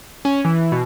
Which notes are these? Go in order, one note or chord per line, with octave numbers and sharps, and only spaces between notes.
C#4
E3
B2